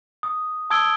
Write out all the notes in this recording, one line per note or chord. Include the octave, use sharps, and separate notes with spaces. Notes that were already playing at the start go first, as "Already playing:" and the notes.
D#6
A5 D#6 E6 G#6 D7 G7